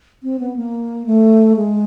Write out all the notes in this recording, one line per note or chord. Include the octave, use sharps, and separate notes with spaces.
C4
B3
A#3
A3
G#3